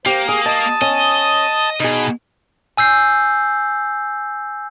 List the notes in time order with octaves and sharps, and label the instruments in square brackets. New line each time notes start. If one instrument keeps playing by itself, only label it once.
[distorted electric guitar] A#3 [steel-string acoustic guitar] G4 [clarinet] C5
[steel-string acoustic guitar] G#4 [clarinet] D#6
[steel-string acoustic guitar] D#5 [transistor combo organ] A5
[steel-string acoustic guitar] C#4 [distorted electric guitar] D#5
[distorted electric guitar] B2 [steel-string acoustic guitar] D#4 G#4
[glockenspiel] G#5 E6 G6 C7